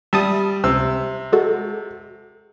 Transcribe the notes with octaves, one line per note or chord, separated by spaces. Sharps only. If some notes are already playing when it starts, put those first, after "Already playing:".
G3 E5 A5 D#6
C#2 C3 E6
G#3 F#4 A4